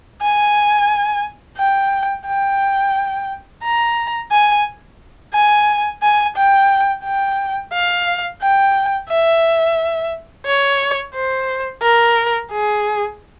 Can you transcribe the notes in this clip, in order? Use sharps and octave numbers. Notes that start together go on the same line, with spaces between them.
G#5
G5
G5
A#5
G#5
G#5
G#5
G5
G5
F5
G5
E5
C#5
C5
A#4
G#4